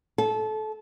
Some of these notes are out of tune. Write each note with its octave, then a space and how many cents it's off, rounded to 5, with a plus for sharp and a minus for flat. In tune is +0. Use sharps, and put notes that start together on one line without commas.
A4 -25